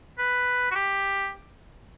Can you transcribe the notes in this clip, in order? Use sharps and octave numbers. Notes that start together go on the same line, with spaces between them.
B4
F#4
G4